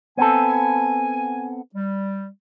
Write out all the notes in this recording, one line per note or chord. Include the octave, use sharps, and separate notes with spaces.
B3 C4 A4 G#5
G3